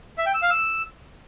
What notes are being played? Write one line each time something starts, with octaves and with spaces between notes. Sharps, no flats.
E5
G5
E6
F5
E6